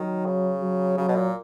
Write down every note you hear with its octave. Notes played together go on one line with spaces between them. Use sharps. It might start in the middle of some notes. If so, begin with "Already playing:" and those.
Already playing: D#3 F#3
C#3
F#3
C#3 F#3
B2
A#2